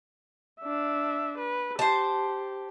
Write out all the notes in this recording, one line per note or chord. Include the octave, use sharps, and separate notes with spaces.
D4 E5
B4
G4 C5 A5